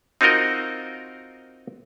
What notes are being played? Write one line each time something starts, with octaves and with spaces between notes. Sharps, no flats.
C4 D#4 F4 F#4 A#4 D#5